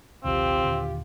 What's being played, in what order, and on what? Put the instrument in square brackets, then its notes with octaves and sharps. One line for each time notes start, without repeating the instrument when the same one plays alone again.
[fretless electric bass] A#1 D#2 C3 [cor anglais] C4 [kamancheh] F4 G4
[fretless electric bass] D#2 A#2 D3